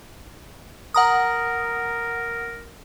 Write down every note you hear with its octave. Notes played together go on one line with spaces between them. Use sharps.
A#4 F#5 A#5 D#6